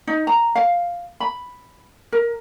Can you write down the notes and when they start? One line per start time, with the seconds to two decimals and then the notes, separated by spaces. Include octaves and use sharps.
0.07 D#4
0.27 A#5
0.55 F5
1.20 B5
2.12 A#4